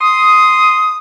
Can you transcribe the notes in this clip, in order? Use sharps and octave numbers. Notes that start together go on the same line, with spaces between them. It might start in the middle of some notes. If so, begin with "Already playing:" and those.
C6 D#6